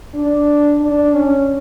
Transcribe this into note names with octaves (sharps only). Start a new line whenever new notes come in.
D4
D4
C#4